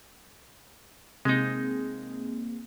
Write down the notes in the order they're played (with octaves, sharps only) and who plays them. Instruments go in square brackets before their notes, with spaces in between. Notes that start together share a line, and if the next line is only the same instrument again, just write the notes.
[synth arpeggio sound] C3 G6 [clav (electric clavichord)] G#3 D#4 [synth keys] A#3 C4 G#4